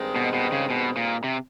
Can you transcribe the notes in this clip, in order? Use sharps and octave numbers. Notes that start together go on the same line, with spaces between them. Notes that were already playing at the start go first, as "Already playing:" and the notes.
Already playing: G2 D#3 G#3 C4
B2
B2
C#3
B2
A#2
C3